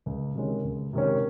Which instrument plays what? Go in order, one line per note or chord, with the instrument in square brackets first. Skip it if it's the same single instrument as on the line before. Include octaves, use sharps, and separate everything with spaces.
[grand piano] C#2
C3 D#3 G#3 C#4
C#2
C3 D#3 G#3 C#4